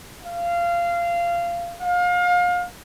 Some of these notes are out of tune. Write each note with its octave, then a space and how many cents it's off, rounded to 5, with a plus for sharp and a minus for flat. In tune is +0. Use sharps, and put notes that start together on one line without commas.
F5 -20
F5 +30